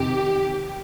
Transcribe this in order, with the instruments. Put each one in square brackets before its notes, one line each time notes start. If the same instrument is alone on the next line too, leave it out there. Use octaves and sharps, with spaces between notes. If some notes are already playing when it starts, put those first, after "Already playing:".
Already playing: [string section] F2 C3 D#3 G4